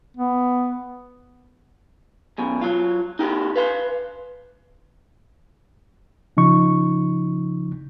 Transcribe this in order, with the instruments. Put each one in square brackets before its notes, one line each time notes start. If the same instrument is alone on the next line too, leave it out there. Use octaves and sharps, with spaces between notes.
[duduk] B3
[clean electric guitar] F#2 B2
F#3 F4
D#4 F#4 G4
B4 F5 C6
[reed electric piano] C#3 F3 D#4 C#6